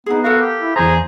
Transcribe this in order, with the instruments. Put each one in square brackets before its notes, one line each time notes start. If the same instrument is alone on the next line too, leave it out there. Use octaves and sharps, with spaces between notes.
[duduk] B3 [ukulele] D#4 G#4
[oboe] F#4 [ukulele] A4 A#4 F5
[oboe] G4
[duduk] E4
[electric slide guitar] E2 A#5 [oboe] G#4 [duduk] C5